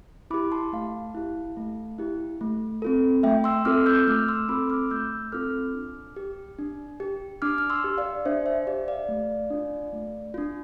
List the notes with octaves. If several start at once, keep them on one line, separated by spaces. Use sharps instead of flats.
E4 G4 B5 D6
A5 C6
A3 F5 A5
E4 G4
A3
E4 G4
A3
C4 F4 A4
A3 E5 G5
C6 E6
C4 F4 A4 D6 F6
E6 G6
A3 D6 F6
C6 E6
C4 F4 A4 B5 D6
D6 F6
A3 E6 G6
C4 F4 A4 D6 F6
D4
G4
D4
G4
D4 D6 F6
F6
C6 E6
G4
D5 F5
D4 C5 E5
C5 E5
G4 D5 F5
D5 F5
A3
D4 F4
A3
D4 F4